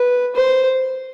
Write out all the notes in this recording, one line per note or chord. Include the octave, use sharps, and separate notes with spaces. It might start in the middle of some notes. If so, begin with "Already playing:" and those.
Already playing: B4
C5